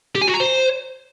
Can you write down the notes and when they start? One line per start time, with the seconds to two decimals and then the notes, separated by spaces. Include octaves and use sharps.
0.15 G4
0.22 G#5
0.28 F#4
0.34 A#5
0.40 C5